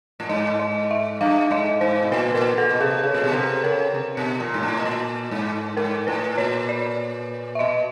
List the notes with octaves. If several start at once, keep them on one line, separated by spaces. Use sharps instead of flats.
A2
G#2 D#5
D#5
E5
G2 F5
G#2 D#5
G#2 C5
B2
A#2 B4
A#2 A#4
A#2 A4
B2
C3 G#4
C#3 G#4
A#2
B2
C3 A4
C#3 A#4
C3
B2
A#2
G#2
A2
B2
A#2
G#2
G#2 A#4
A2 B4
A#2 C#5
D5
E5
B2 D#5